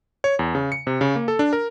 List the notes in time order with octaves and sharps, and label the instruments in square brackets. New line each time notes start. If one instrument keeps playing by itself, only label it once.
[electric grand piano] C#5
E2
C#3
C#7
C3
C#3
A#3
A4
D4
A#4